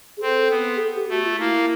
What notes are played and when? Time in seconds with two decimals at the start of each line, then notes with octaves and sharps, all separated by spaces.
0.17 G#4
0.22 C4 A4
0.50 B3
0.76 G#4
0.80 A4
0.95 G4
1.09 A3 F#4
1.24 F4
1.38 A#3 E4